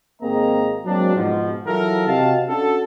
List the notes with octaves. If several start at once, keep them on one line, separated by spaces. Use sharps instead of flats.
G#1 A#3 C4 G#4 D#5 A#5
F#3 G#3 A#3 C4 D4
G#2 B2 F3
E3 F#3 E4 F4 A4 A#4
C3 F#4 G4 D#5 F5 A5
C#4 D4 F#4 A4